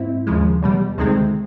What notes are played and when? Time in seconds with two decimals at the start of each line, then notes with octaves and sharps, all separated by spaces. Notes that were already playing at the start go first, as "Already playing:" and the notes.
Already playing: G#2 C4 E4
0.27 D#2 C#3 F3 G#3
0.62 E2 B2 G3
0.98 D2 C3 D#3 G#3 C4